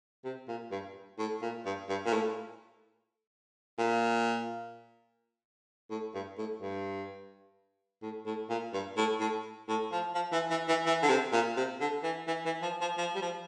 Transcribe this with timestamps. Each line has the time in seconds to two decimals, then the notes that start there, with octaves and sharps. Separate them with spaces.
0.24 C3
0.48 A#2
0.71 G2
1.19 A2
1.42 A#2
1.66 G2
1.89 G2
2.06 A#2
2.13 A2
3.78 A#2
5.90 A2
6.14 G2
6.38 A2
6.61 G2
8.03 A2
8.26 A2
8.49 A#2
8.73 G2
8.97 A2
9.20 A2
9.68 A2
9.92 F3
10.15 F3
10.32 E3
10.50 E3
10.68 E3
10.86 E3
11.02 D3
11.09 C3
11.33 A#2
11.57 C3
11.80 D3
12.03 E3
12.27 E3
12.45 E3
12.62 F3
12.81 F3
12.97 F3
13.15 G3
13.22 F3